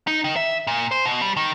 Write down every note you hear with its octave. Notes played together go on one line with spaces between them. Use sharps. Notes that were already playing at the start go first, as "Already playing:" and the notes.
D#4
D#3
E5
A#2
C5
B2
G3
D#3